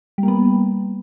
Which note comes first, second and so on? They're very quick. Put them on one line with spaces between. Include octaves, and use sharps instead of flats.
G3 A#3 B3